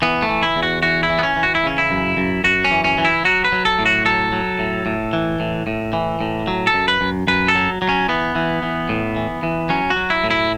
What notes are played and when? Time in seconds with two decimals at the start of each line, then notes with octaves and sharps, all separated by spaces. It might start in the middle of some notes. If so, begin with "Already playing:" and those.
0.02 E3 B3
0.22 A3
0.29 E3
0.43 E4
0.56 E2
0.63 F#4
0.83 E3 F#4
1.03 E4
1.10 E3
1.19 B3
1.23 C#4
1.36 E3
1.43 F#4
1.55 E4
1.64 C#3 C#4
1.78 E4
1.91 F#2
2.17 F#2
2.44 F#2 F#4
2.64 C#4
2.71 E3
2.84 C#4
2.98 E3
3.05 E4
3.25 F#3 F#4
3.45 B4
3.52 F#3
3.65 A4
3.79 A2
3.86 F#4
4.05 F#3 A4
4.32 F#3
4.59 A2
4.86 A2
5.13 E3
5.40 A2
5.67 A2
5.93 E3
6.21 A2
6.47 F#3
6.67 A4
6.74 F#2
6.88 B4
7.01 F#2
7.27 F#2 B4
7.48 A4
7.55 F#3
7.82 F#3
7.89 C#4
8.09 E3 B3
8.35 E3
8.63 E3
8.89 A2
9.16 E3
9.43 E3
9.69 F#3 C#4
9.90 F#4
9.96 F#3
10.10 E4
10.24 A2
10.31 E4